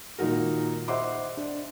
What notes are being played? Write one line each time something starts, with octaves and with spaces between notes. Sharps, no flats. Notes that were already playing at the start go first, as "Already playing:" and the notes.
A#2 D#3 D#4 F#4 A#4
C5 D#5 E5 F#5 C6 D6
D4